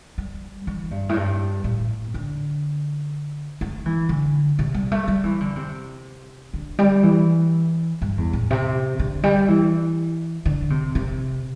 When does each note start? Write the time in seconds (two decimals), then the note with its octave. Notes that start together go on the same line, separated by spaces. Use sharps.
0.18 G3
0.67 E3
0.91 G2
1.09 A2
1.16 G2
1.64 A2
2.14 D3
3.61 A3
3.86 E3
4.09 D3
4.59 C3
4.74 G3
4.92 A3
5.08 G3
5.24 E3
5.41 D3
5.56 C3
6.54 D3
6.79 G3
7.03 E3
8.02 G2
8.18 E2
8.33 A2
8.50 C3
8.99 D3
9.24 G3
9.48 E3
10.46 D3
10.70 C3
10.95 C3